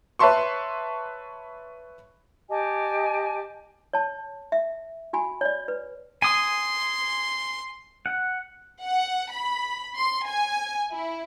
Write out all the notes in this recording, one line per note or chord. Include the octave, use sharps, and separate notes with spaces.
B4 C#5 E5 A5 C6 C#6
G4 D#5 G#5 A5
C#5 A5
E5
F#4 G#5 B5
C#5 D5
B4
G#5 C6 D#6
F#5
F#5
B5
C6
G#5
E4